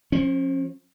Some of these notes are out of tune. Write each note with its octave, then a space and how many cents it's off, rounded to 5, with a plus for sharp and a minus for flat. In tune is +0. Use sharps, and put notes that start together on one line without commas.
F3 +20 C#4 -35